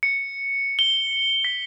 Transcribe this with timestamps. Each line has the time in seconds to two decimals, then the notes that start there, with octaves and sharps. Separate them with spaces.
0.03 C#7
0.79 G7
1.44 B6